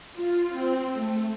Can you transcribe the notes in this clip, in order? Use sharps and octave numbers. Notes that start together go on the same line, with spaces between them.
F4
C4
A3